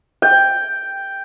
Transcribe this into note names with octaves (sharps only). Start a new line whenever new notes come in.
G5